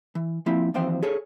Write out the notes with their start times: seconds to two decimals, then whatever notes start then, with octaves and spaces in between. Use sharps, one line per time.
0.15 E3
0.46 F3 A#3 C4 E4
0.74 D#2 E3 F3 C4 C5 G5
1.03 G#4 A4 C#5